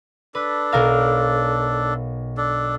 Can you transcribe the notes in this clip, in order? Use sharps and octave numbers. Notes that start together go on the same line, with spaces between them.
D4 A4 B4
B1 A#4 F5
D4 A4